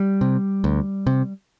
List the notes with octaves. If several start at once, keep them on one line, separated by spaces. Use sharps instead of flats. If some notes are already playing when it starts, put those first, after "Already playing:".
Already playing: G3
C3
D2
C3